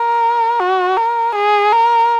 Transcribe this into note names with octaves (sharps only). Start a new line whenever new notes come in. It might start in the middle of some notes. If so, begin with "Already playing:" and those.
Already playing: A#4
F#4
A#4
G#4
A#4